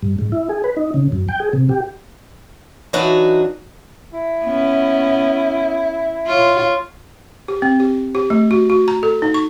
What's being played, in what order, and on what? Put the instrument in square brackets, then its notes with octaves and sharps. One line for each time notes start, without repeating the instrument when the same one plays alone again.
[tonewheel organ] G2
G#2
E4
G#4
B4
D#4
C#3
F#2
G5
G#4
C3
G4
[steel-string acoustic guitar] E3 F#3 D4 D#4 F#4
[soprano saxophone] E4
[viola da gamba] B3 C#4
F4 C#5
[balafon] G4
C4
G4
G4
A3
F#4
F#4
A#5
A4
D#4
C#6